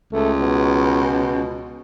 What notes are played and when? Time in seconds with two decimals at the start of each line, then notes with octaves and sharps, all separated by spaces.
0.13 C#2 A3
0.41 B2